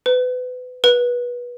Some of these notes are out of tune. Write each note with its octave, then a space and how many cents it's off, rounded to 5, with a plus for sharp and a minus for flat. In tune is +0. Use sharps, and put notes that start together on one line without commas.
B4 +30
B4 -25